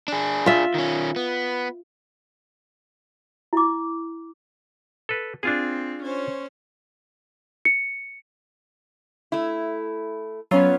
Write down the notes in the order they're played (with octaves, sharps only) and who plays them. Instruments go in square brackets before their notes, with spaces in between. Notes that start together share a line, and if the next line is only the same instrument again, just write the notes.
[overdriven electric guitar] D4 G#4
[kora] F4 E5
[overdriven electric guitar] D#3 C#4
B3
[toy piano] E4 D6
[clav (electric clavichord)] A4 B4
[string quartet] C4 [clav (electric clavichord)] D4 F4 G#4
[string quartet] C#4 C5 C#5
[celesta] C#7
[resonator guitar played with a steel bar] A3 E4
[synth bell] F#3 [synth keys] B3 C#4 F4 [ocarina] C#5